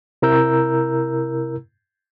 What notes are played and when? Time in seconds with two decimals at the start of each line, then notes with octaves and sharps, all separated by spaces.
0.22 C3 E4 A#4 A#5 E6 G6